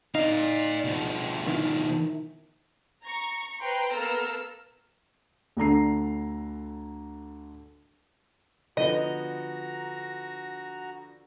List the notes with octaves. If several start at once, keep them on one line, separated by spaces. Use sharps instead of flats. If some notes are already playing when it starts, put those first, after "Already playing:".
D#4 D5 F5
B2 F3
D#3 E4
A#5 C#6
B4 C5 G5 A#5 C6
A#3 B3 A4 A#5 E6 F6
D2 D3 A#5 C7
D3 F3 B3 F#4 D#5 A#5